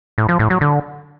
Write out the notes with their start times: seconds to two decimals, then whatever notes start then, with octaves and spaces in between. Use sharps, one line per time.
0.18 A2
0.29 F3
0.39 A2
0.50 F#3
0.61 D3